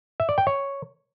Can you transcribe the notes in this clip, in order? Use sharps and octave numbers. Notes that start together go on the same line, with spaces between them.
E5
D5
G5
C#5